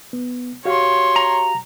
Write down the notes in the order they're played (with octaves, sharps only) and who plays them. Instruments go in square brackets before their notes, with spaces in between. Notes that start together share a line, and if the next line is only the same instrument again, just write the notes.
[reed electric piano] B3
[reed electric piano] F#4 G4 F5 [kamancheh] C#5 C6
[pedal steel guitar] A#5